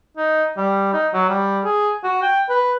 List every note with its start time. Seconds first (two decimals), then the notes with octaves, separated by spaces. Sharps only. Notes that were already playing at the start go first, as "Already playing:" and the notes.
0.17 D#4
0.57 G3
0.93 D#4
1.13 F#3
1.29 G3
1.64 G#4
2.03 F#4
2.22 G5
2.49 B4